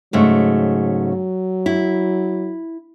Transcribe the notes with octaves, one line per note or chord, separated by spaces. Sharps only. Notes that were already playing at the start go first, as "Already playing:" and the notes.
G#2 C#3 F#3 A3
E4